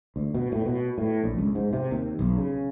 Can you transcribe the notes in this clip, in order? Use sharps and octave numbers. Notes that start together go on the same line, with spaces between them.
D2
B2
A2
B2
A2
A#1
C#2
G#2
C3
D#2
B1
C#3